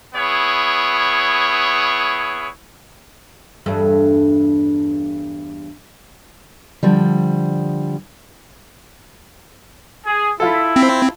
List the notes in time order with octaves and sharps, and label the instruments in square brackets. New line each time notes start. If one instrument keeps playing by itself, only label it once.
[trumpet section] B3 E4 G#4 C#5
[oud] E2 G2 A3
[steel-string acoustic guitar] D3 F3 G3
[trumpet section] G#4
[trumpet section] E4 [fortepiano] F4 A4
[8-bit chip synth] C4